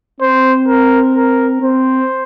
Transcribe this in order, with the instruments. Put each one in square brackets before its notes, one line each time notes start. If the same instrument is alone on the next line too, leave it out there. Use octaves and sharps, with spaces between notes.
[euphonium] C4 [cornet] C5
[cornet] A#4
A#4
[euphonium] C4 [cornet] C5